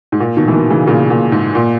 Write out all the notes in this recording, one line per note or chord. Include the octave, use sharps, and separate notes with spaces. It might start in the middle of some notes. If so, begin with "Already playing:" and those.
G#2
A#2
B2 D#3
E3
B2 D#3
C#3 E3
A#2 C#3
A#2
G#2
A#2